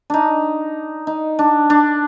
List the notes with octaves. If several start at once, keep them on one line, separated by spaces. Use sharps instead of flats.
D4 D#4
D#4
D4
D4